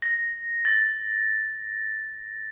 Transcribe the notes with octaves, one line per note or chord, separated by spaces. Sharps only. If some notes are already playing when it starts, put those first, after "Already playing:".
A#6
A6